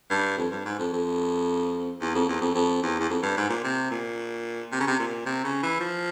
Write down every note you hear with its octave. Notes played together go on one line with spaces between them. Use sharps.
G2
F2
G2
G#2
F2
F2
E2
F2
E2
F2
F2
E2
E2
F2
G2
G#2
A#2
C3
A#2
C3
C#3
C3
A#2
C3
C#3
E3
F3